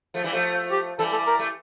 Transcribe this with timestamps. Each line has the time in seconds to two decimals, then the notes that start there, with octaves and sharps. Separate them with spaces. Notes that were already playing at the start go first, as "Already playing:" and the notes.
0.14 F3 A3
0.24 E3 G3
0.33 F3 A3
0.71 G4
0.99 E3 G3 A4
1.13 A4
1.27 A#4
1.39 A3